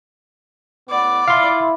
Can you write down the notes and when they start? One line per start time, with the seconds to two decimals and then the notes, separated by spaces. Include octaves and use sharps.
0.90 A2 B3 D5
1.28 E4 F5 C6